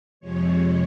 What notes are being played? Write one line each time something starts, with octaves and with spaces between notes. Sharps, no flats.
F2 C3 F3 G#3 C#5